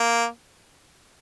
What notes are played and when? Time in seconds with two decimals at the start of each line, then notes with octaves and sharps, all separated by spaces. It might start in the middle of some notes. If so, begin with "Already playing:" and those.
Already playing: A#3